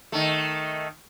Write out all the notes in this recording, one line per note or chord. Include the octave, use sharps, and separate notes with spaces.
D#3 A3